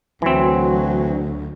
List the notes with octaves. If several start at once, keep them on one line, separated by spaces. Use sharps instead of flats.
D2 E3 F#3 C4